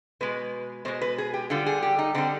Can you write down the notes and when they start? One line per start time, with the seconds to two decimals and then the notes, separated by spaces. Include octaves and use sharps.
0.21 B2 G#3 B4
0.85 B2 G#3 C5
1.01 B4
1.18 G#4
1.34 G4
1.50 D3 G3 F4
1.66 G#4
1.82 G4
1.99 D#4
2.15 D3 G3 C4